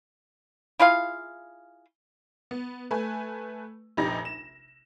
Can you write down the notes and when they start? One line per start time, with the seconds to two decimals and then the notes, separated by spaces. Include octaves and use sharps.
0.80 E4 F4 G#4 F5
2.51 B3
2.91 A3 B4 G#5
3.97 F1 A#1 C3 D#4 G4 A#6
4.25 E7